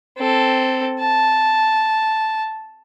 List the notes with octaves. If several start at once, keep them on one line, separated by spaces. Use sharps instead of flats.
C4 A4
A5